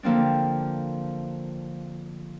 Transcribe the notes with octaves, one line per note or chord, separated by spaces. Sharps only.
D3 F3 A#3 C4 D4